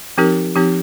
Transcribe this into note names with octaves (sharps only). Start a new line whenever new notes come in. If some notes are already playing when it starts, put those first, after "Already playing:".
F3 C4 D#4 G4 A#4
F3 C4 D#4 G4